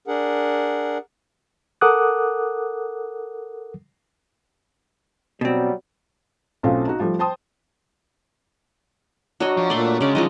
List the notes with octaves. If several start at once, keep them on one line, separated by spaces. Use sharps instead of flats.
D4 G#4 A#4 F#5
A4 A#4 F#5 D6 D#6 F#6
B2 F#3 G3 C4
B1 A3 C4 C#4 F4 F5
D#4 F#4
F3 G3 A3
C5 G5 A5 C6 D#6
F#3 D4 F#4 C#5 D#5
F3
A#2 A3 D5 C6
C#3 G#3 C#4 D5
D#3 F3 F#3 G#3 D#4 D#5